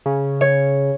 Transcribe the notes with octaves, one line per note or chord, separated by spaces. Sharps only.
C#3
C#5